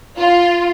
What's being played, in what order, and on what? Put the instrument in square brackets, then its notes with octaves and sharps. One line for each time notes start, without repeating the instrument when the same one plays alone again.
[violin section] F4